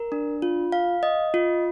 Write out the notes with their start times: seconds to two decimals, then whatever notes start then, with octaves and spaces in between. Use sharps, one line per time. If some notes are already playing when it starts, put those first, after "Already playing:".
Already playing: A#4
0.12 D4
0.42 F4
0.72 F5
1.03 D#5
1.34 F4